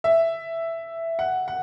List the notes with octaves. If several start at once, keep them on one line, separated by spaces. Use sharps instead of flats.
E5
F#5
F#5